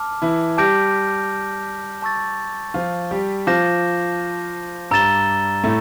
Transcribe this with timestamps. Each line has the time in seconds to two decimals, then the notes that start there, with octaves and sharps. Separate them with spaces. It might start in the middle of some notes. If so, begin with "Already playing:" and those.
Already playing: A5 D6 F6
0.22 E3 E4
0.58 G3 G4 A5 D6 G6 A#6 D7
2.02 A5 C#6 E6 A6
2.74 F3 F4
3.11 G3 G4
3.47 F3 F4 A5 D6 G6 A#6 E7
4.91 G2 G3 A#5 E6 A6 E7 G7
5.64 A2 A3